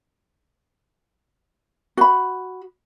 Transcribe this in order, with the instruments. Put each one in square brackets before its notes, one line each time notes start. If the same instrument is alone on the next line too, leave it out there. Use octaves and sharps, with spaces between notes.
[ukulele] F#4 B5